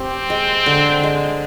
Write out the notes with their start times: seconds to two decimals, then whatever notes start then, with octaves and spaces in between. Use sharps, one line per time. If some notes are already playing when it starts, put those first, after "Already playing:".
Already playing: C4 G4
0.30 G#3
0.66 D3
1.03 G#3